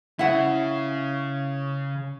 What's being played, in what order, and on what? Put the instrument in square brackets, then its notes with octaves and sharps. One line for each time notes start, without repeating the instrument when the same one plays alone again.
[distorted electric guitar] C#3 [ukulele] E4 F#5